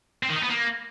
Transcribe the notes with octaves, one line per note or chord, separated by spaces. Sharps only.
C4
D#3
D#4
B3
A#3